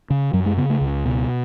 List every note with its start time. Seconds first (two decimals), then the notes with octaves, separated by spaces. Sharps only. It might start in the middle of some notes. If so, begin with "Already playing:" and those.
0.10 C#3
0.33 F#2 F#3
0.46 G#3
0.57 C#3 B3
0.70 A3
0.81 C#2
1.05 B2